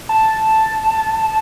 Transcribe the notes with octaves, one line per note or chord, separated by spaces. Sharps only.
A5